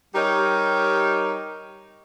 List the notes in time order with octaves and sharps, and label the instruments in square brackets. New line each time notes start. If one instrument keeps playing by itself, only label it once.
[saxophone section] G3 D#4 G4 A#4 C#5 D#5